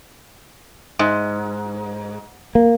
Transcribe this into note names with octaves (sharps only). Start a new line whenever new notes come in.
G#2
A#3